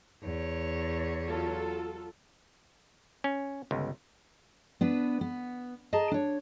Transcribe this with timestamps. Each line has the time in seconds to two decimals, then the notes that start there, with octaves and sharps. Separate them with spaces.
0.23 E2 C#5
1.28 F#3 F4 A4
3.24 C#4
3.71 G1 C#2
4.81 B3 D4 B4
5.21 B3
5.93 G#4 D#5 A5 A#5
6.11 D4 C#5